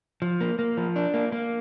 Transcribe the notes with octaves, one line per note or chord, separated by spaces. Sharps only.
F3
A#3
A#3
F3
D4
A#3
A#3